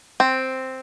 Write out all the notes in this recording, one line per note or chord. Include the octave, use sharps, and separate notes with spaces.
C4